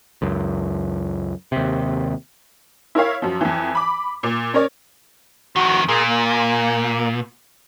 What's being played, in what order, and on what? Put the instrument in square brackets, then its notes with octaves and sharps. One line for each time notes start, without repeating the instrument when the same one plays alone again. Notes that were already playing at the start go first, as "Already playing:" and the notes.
[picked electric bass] C#2 F#2
D#2 C3
[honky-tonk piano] E4 A#4 C#5 F5
F#2 F3
F2 E3
B5 D6
A#2
C#4 A#4 C#5 D5
[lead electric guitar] F2 D#3 [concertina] F#4
[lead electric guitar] A#2 [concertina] G#4 A#4
[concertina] A#3